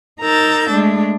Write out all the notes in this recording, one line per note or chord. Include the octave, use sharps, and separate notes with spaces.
D#4 A#4 A#5 E6 G6 A6
G#3 A3 D4